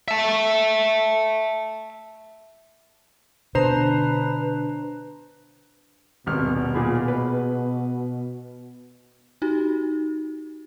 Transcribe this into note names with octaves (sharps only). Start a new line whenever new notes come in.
E5 A5
B2 D3 D4 B4 C5 A#5
D#1 G#1 B2 F6
A#2 G#4 B5
B4
D#4 F#4 G4